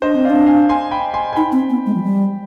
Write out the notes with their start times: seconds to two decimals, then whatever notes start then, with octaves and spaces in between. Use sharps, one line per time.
0.02 D4 C5 D#5
0.15 C4
0.25 D5 F5
0.30 D4
0.46 F5 G#5
0.69 G#5 C6
0.91 G5 B5
1.14 G#5 C6
1.33 G#5
1.35 D#4 G5 B5
1.52 C4
1.70 B3
1.86 G#3
1.95 F3
2.04 G3